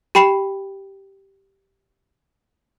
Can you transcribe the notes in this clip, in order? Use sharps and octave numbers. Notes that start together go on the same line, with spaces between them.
G4 G5 B5 C7 E7